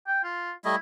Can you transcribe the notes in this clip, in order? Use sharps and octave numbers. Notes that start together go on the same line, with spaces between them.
G5
F4
G3 A3 E4 D#5